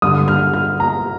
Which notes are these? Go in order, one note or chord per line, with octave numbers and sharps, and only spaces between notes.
G2 D3 G3 D#6
F6
F6
A#5